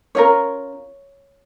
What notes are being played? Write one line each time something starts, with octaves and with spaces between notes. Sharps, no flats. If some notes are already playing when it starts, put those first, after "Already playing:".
C#4 F4 A#4 C#5